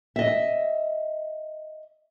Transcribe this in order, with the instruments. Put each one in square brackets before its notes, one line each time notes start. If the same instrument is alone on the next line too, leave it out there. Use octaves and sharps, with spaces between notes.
[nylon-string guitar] D#5 E5